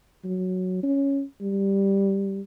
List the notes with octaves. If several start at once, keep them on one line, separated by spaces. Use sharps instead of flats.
F#3
C#4
G3